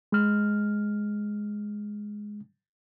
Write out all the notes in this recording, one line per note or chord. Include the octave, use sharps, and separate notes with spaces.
G#3 F6